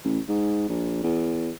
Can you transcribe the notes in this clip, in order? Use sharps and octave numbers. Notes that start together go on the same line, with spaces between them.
A1
G#2
A#1
E2